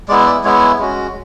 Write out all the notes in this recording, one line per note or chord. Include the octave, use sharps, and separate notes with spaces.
G#3 B3 E4 D5
D5
G#3 B3 E4 C#5
G#3 C#4 F#4